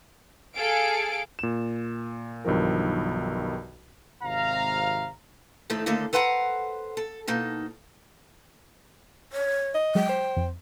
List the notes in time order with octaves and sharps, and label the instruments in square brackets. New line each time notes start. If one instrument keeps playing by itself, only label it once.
[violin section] G#4 A4 F5 D7
[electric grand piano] A#2 E7
B1 G2 D#3 F3 A#4
[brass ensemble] G#1 C3 F5 A#5
[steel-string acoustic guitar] F2 A2 D#3 A3 A4
D#2 D3 A3 A#3 A4 D#5
A4 B4 C5 F#5 G#5 A#5
A4
B2 A#3 D#4 A4
[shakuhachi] C#5
[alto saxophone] D#5
[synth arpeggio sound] F#3 G#3 [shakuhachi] G5
[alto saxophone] C5
[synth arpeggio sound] F2